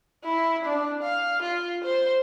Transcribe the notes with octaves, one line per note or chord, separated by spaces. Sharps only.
E4
D4
F5
F4
C5